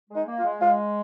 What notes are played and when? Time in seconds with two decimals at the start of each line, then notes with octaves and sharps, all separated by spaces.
0.10 G#3
0.16 D#4
0.27 A#3
0.39 F4
0.44 G#3
0.61 G#3 F4